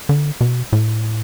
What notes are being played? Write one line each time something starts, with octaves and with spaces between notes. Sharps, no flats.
D3
B2
A2